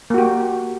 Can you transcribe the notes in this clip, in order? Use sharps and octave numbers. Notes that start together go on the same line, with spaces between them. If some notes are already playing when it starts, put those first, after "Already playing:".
A#3 F#4 G4